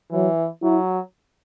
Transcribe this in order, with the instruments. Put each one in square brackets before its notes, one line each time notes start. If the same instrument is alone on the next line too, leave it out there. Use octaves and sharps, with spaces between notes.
[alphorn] E3 [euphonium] F#3
[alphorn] F#3 [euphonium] E4